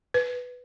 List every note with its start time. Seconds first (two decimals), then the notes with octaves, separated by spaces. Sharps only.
0.14 B4